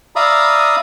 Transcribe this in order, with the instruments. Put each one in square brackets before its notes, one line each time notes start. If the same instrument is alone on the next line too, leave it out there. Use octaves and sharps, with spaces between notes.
[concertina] D5 E5 F5 A#5 B5 D#6